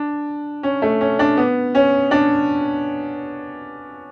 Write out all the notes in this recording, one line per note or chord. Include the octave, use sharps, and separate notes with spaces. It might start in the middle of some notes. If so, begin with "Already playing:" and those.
Already playing: D4
C#4
A3
C#4
D4
B3
C#4
D4